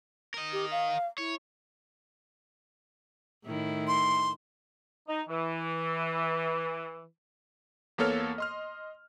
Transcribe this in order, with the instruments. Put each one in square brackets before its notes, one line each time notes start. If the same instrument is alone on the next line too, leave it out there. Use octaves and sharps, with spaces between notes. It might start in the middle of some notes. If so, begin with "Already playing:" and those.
[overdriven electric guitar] A#4 D#5
[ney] G4
F5
[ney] E4 [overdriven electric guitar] C#5
[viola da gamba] A2 D#3 E4
[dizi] C6
[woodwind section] D#4
E3
[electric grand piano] E2 A#3 B3 A4 C#5 F6
D#5 C6 F6